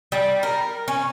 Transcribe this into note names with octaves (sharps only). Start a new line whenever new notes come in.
G3
A#4
C#4